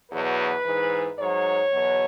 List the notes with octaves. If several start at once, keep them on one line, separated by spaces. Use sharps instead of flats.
E2 B2 F#3 B4
G#2 E3
G#2 F#3 C#5
E2 B2 F#3